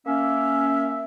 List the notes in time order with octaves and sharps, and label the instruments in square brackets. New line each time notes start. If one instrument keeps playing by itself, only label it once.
[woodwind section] A#3 C#4 E5